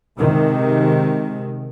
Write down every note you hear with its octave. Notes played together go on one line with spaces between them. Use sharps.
C3 D#3 G#3